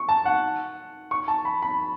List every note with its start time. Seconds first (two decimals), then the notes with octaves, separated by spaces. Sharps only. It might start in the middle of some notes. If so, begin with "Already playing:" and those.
Already playing: C#6
0.09 A5
0.25 F#5
1.11 C#6
1.28 A5
1.45 B5
1.62 B5